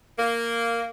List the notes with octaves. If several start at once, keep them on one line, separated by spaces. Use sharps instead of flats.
A#3